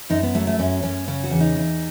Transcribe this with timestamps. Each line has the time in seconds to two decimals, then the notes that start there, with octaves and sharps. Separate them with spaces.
0.10 F#2 D#4
0.23 B3
0.35 F#3 A3
0.47 A3
0.59 F#2 C#4
0.83 F#2 C#4
1.07 C#3 C#4
1.24 F#4
1.31 E2
1.41 D#4
1.57 E2